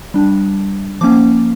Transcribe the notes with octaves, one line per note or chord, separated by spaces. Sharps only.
G3 D4
F3 A#3 C#4 D6